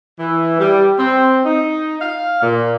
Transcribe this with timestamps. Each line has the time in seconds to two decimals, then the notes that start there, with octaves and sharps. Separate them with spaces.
0.20 E3
0.59 G3
0.98 C4
1.45 D#4
2.01 F5
2.41 A#2